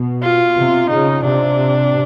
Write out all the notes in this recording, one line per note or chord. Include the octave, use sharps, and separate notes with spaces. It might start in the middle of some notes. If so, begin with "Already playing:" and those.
Already playing: B2
F4
C3
C#3 D#4
C3 D4